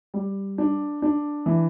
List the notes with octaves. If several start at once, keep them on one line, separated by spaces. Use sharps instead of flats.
G3
D4
D4
E3